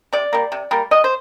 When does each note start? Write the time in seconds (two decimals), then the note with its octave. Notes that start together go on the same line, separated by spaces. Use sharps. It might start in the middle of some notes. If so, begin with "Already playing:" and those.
0.13 C3 D5
0.33 G3 A#3
0.52 C3
0.71 G3 A#3
0.91 C3 D#5
1.04 C5